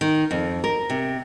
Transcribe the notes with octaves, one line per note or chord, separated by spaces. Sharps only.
D#3
F2
A#4
C3